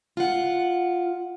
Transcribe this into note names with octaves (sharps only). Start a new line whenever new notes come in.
F4 F#5